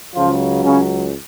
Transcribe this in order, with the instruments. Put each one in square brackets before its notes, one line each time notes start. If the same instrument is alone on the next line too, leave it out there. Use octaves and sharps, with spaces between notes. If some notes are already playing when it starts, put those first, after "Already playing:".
[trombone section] C#2 C#3 F3 F#3 F4
C#3 C#4